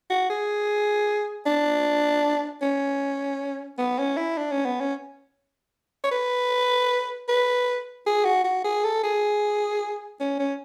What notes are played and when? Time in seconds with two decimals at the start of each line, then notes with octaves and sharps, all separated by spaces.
0.10 F#4
0.30 G#4
1.46 D4
2.62 C#4
3.78 B3
3.99 C#4
4.17 E4
4.37 D4
4.51 C#4
4.66 B3
4.80 C#4
6.04 C#5
6.11 B4
7.29 B4
8.06 G#4
8.25 F#4
8.44 F#4
8.64 G#4
8.84 A4
9.03 G#4
10.20 C#4
10.39 C#4